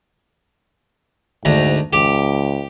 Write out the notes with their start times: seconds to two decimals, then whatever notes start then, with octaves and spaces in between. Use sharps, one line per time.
1.45 D2 G#2 A#5
1.93 C#2 G4